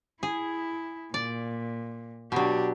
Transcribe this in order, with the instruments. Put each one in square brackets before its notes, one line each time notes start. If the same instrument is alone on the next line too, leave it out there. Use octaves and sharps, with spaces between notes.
[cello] E4 [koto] G#4
[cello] A#2 [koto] D5
[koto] B2 F#3 [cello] D4 G4